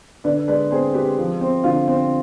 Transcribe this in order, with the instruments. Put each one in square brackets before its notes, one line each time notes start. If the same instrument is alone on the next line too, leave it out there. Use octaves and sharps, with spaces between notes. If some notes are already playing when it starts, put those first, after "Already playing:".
[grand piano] D3 B4 D5
G#3 B4 D5
C4 G#4 C5
G#3 G4 B4
F3
C4
D3 F4
C4